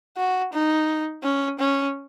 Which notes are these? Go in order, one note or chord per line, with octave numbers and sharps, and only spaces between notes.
F#4
D#4
C#4
C#4